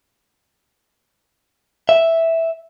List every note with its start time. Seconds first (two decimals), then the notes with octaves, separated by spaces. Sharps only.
1.89 E5